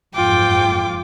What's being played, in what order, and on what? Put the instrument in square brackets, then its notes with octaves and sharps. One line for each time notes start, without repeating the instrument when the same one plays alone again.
[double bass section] F#1 F2 G#2 [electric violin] F4 D6 [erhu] G5